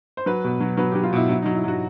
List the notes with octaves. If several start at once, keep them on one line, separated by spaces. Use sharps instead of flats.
C5
F#3 B4
B2
F#3
F#3 B4
G4
F#3
F4
B2 E4
F#3 E4
D#4
F#3
E4
F#3 F#4